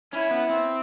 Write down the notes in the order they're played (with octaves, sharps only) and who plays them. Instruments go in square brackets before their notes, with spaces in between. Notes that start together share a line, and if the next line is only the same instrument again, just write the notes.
[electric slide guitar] C#4 [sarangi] E4
[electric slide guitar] B3
C4